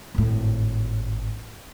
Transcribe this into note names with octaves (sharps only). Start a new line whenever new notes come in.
G#1 A2